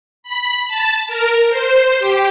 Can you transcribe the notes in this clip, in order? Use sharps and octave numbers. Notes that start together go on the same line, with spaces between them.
B5
A5
A#4
C5
G4